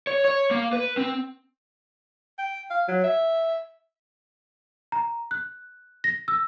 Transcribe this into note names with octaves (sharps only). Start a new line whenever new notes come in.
C#5
C#5
A#3
B4
C4
G5
F5
F#3
E5
A#5
F#6
A#6
E6